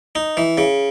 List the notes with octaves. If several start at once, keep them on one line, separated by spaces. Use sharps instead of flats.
D#4
E3
C#3